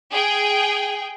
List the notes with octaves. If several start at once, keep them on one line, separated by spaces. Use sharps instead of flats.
G#4 G5